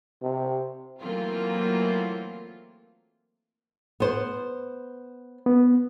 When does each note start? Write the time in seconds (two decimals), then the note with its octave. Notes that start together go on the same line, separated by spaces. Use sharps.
0.23 C3
1.00 E3 F#3 A3 A#3 C4 F4
4.00 B3 C5
5.46 B3